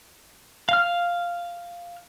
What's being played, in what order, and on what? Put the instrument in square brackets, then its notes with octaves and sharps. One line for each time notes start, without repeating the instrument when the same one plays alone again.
[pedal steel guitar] F5 F6